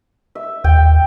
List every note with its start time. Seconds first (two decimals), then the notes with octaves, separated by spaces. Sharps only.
0.35 E5
0.64 D#2 G5